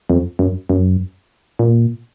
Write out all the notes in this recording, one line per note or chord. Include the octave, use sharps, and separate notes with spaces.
F2
F#2
F#2
A#2